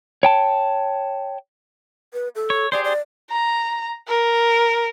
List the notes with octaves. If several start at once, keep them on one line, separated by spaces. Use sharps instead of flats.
C#5 G5 A5
B4
A4
C#5
G4 G#4 C5 D5
D5
A#5
A#4